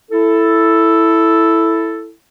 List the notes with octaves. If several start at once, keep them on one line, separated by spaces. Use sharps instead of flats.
E4 A4